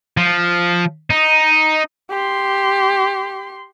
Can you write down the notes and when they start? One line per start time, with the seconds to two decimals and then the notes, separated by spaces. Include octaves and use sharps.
0.17 F3
1.10 D#4
2.10 G4 C6